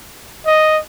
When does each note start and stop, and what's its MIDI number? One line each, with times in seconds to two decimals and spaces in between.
0.47 0.79 75